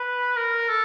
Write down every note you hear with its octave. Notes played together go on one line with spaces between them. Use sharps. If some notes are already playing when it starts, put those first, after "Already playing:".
Already playing: B4
A#4
A4